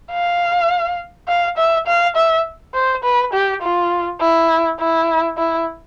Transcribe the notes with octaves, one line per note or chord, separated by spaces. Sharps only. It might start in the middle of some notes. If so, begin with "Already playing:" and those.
F5
F5
E5
F5
E5
C5
B4
G4
F4
E4
E4
E4